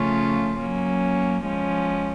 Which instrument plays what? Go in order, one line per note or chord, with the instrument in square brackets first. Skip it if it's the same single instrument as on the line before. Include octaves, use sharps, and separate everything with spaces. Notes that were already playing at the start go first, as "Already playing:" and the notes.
Already playing: [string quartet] C#3 F3 A3 C#4 F4
F#3 A#3 C#4
F3 G#3 C#4